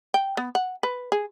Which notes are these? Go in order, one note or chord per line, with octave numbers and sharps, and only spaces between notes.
G5
B3
F#5
B4
G#4